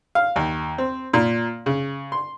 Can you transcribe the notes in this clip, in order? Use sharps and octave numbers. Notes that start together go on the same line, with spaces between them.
F5
D#2
C4
A#2
C#3
C6